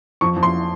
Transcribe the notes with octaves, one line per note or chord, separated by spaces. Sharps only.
F2 C#6
F2
C6